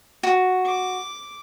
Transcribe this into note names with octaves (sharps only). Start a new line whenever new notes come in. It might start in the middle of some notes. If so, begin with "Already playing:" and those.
F#4
D6